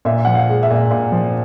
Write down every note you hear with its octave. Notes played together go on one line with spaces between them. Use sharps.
A#2 E5
F3 F#5
F5
G#3
E5
A#2
A#2
F3